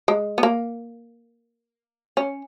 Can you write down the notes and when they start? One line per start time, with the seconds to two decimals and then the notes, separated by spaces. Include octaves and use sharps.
0.08 G#3
0.38 B3
0.43 A#3
2.17 C#4